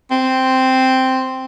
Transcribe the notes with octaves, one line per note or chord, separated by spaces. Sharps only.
C4